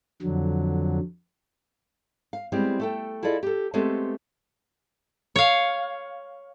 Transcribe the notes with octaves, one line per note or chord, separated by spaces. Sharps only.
F2 D3 F#3
F5
G3 G#3 B3 C4 E4 G4
A3 A4 G5
E4 F4 G#4 A4 D5 D#5
G4 A4
G#3 A3 B3 C4 G4 A4
C#5 F5